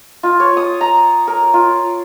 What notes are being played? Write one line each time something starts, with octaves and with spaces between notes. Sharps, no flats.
F4
C#5
D#6
A#5
A#4
F4